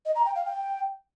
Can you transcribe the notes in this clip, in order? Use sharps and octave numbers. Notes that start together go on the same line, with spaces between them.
D#5
A#5
G5
F5
G5